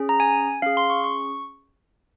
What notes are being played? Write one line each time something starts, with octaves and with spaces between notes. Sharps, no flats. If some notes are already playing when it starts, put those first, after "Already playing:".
Already playing: C#4 G#4
A#5
G#5
C#4 G#4 F5
C6
C#6
C#6